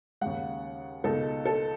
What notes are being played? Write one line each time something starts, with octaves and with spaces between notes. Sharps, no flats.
D#2 C#3 G#3 F#5
C#2 B2 G#3 D#4 A4
A4